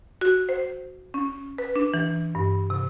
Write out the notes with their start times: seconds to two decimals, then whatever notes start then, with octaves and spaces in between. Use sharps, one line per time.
0.21 F#4
0.49 C5
1.14 C#4
1.58 B4
1.76 D4
1.94 E3
2.35 G2
2.70 C3